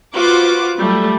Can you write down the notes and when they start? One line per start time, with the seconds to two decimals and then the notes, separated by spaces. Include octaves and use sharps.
0.14 F4 F#4 B4 C5 D6
0.76 F#3 G3 A3